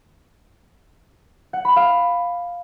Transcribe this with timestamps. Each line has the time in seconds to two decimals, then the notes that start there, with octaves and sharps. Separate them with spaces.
1.53 F#5
1.65 B5
1.76 F5